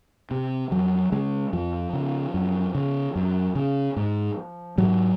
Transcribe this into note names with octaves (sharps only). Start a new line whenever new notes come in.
C3
F2 F#3
C#3 G#3
F2 F3
C#3
F#2
C#3
F#2
C#3
G#2
G#2 F#3